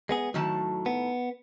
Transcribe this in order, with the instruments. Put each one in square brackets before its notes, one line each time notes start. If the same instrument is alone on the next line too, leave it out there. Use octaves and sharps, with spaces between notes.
[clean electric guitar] G#3 B3 G#4
[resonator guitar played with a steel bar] A2 D#3 A5 [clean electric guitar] F#3
[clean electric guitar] B3